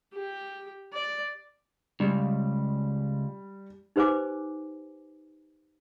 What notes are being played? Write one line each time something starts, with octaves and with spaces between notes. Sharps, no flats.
G4
D5
C#2 G3
D#4 G4 B4 C5 G#5 D6